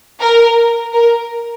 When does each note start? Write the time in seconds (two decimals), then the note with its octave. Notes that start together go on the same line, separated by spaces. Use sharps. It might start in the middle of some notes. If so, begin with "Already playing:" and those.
0.20 A#4
0.93 A#4